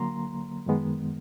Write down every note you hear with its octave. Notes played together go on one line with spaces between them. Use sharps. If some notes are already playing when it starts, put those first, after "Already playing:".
Already playing: D3 F#3 A#3 A#5 C6
F#2 D#3 G#3 B3